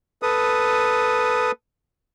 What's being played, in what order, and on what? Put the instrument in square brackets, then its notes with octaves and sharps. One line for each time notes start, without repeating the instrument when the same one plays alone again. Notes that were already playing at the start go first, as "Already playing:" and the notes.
[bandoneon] A4 B4 D#6